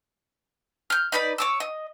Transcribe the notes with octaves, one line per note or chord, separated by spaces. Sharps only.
F6 G6
D#4 B4 D5 B5
C#5 D6 E6
D#5